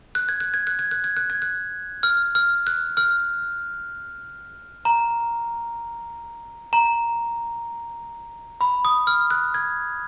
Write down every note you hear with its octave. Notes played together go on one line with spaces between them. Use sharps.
F#6
G#6
F#6
G#6
F#6
G#6
F#6
G#6
F#6
G#6
F#6
F6
F6
F#6
F6
A#5
A#5
B5
D#6
F6
F#6
G#6